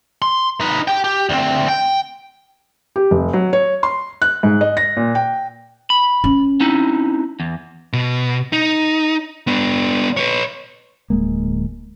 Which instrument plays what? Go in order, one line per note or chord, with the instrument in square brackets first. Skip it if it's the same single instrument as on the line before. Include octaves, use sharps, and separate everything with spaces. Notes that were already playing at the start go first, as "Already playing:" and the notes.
[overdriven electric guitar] C6
D#4 B4
G4 G5
G4
D2 C4
G5
[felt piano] G4
F1
F#3
C#5
C6
F#6
G#2
D#5
A#6
A#2
G5
[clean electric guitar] B5
[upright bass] C#4
[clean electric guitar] C4 D#4 E4
E2
[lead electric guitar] B2
D#4
B3 D4
B4 C#5
[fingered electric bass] D1 G#3 A#3